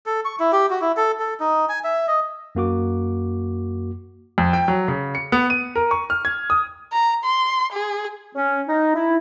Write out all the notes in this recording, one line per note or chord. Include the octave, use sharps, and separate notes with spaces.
A4
C#6
E4
G4
F#4
E4
A4
A4
D#4
G#5
E5
D#5
F#2 A#3 F#4 D6
F2
G5
F#3
C#3
C#7
B3
D#7
A#4
C#6
F6
G#6
D#6
A#5
C6
G#4
C#4
D#4
E4